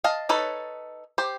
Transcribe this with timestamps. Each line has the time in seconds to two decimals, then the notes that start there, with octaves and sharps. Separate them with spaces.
0.04 D#5 F5 A5
0.29 D#4 A4 B4 C#5
1.18 G4 C5